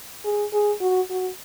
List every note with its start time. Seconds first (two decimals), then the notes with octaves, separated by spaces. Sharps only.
0.25 G#4
0.53 G#4
0.81 F#4
1.10 F#4